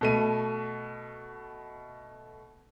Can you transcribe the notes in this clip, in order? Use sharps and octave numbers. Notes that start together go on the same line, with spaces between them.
B2 A3 D#7